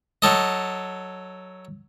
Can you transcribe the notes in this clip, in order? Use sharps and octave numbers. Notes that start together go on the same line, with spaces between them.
F#3 A4 D#5